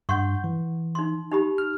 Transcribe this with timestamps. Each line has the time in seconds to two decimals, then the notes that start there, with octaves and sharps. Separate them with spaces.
0.09 G2 F#5 C6 C#6 G6
0.44 E3
0.95 D#4 C6
1.31 D#4 G4 B5
1.58 F6